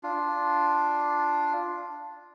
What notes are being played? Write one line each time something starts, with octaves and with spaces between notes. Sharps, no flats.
D4 F4